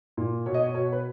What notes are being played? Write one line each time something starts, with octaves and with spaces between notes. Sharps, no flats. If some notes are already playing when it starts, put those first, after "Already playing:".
A#2
B2 C#5
D#5
C#5
B2 C#5
B4